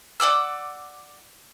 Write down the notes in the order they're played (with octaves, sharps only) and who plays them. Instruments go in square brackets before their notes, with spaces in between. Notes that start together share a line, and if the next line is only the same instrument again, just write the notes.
[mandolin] D5 F#5 D6 E6